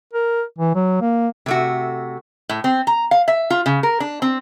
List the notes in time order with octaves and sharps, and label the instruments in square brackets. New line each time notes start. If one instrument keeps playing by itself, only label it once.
[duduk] A#4
E3
F#3
A#3
[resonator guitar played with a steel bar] C3 A3 F#4
A2
C4
A#5
F5
E5
F4
C#3
A#4
D4
C4